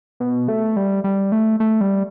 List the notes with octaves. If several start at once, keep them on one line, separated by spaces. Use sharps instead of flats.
B2
A3
G3
G3
A3
A3
G3